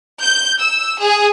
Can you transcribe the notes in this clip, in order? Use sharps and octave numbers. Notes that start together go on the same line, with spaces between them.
G6
E6
G#4